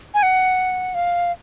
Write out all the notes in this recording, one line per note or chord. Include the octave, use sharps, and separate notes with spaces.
G#5
F#5
F5